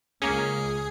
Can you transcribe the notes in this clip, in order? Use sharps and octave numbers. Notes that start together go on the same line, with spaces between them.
C#2 A#3 C#4 G#4